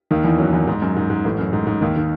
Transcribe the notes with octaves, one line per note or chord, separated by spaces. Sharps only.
D#2 D#3
E2 E3
F#2 F#3
E2 E3
G#2
F#2
G#2
G#2
A1 A2
F#2
G#2
G#2
D#2 D#3
D#3